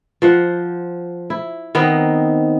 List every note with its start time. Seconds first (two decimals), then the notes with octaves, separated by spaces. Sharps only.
0.22 F3 C5 F#5
1.30 E4
1.75 D#3 B3 C4 D#4